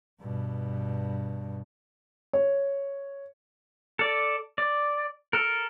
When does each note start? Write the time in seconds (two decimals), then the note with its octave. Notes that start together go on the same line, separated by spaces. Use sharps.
0.22 G2 B2
2.33 C#5
3.99 A4 D5
4.58 D5
5.33 A4 A#4